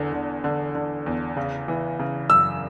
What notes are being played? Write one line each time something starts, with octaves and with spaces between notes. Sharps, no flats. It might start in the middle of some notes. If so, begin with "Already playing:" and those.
Already playing: E2 D3
D3
D3
D3
E2
C#3
E3
C#3
F#2 E6